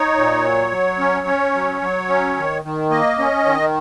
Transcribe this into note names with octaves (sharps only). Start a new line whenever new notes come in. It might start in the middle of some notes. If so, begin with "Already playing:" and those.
Already playing: D#4 C#5
A#2
F#3
F#3
C#4
C#4
F#3
F#3
C#4
D#3
D#3
A#3 D#5
C#4
D#3